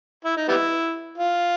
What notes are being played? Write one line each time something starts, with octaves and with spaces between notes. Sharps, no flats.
E4
D#4
G3 B3 E4
F4